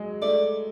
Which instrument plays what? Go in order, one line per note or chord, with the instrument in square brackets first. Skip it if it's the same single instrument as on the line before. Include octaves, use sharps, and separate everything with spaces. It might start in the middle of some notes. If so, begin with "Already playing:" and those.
Already playing: [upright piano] F#3 G#3
[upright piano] A3 [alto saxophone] D5